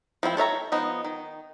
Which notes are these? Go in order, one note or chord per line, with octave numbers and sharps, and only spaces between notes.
F3 C4 E4 G5
A4 C#5 E5 A#5
F3 B3 D#4
D#3